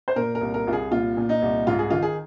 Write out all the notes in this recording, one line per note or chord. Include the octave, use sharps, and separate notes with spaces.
C5
A#2 A#4
A#4
C2
A#4
C2 F4
G#4
A#2 F4
A#2
D#4
C2
G#2 F4
G#4
D#3 F4
G#4